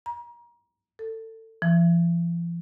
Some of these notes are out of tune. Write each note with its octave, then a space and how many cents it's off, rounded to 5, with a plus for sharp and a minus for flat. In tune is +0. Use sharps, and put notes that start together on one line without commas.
A#5 +30
A4 +25
F3 -45